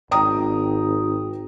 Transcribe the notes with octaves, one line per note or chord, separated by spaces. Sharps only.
G#1 G5 A#5 D#6